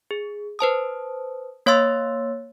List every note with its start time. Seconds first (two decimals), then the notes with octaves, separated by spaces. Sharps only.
0.11 G#4
0.59 B4 C5 A5 D#6
1.66 A#3 C#5 F5 C6 E6 A6